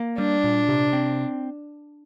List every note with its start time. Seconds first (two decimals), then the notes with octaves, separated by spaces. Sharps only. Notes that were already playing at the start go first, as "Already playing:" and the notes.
Already playing: A#3
0.18 G3 D4
0.44 A#2
0.69 C3
0.93 C4